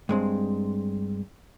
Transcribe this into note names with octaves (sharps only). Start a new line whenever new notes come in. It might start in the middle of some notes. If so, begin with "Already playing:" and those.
G2 G#3 C4